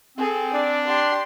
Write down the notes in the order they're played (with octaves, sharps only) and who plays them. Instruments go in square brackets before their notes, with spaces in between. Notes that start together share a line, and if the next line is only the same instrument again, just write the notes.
[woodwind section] C4 [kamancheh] G#4 A4
[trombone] D4 [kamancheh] D5
[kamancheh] G4 C6